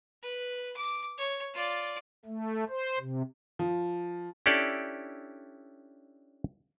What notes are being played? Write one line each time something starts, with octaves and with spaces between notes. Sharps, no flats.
B4
D6
C#5
F4 D5
A3
C5
C3
F3
C#4 D4 E4 G4 A4 D5